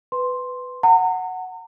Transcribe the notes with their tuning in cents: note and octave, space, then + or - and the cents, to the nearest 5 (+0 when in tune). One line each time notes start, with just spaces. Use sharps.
B4 +10 C6 +0
F#5 +0 A#5 -40